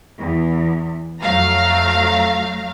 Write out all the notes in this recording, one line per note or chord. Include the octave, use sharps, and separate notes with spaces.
E2
F2 F#3 A3 F5 A#5